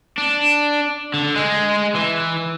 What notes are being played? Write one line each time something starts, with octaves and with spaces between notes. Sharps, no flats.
D4
D3
G#3
E3